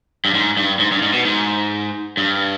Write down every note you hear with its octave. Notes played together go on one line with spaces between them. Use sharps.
G2
G#2
G2
G#2
G2
G#2
B2
G#2
G2